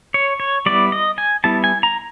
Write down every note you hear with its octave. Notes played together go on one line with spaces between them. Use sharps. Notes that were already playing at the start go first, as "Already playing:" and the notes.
C#5
C#5
G3 B3 E4 D5
D#5
G#5
G3 B3 E4 A5
G#5
A#5